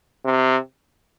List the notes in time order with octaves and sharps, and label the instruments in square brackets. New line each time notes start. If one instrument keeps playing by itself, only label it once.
[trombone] C3